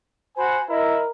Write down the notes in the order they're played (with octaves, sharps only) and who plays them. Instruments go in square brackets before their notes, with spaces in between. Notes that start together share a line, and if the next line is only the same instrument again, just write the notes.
[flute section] F#4 C5 B5 [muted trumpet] G#5
[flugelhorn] E4 [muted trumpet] A#4 [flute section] D#5